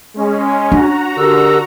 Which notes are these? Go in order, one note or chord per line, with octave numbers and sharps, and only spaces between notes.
G#3 C#4
D4 F#4 A#5
D3 G4 A#4 E6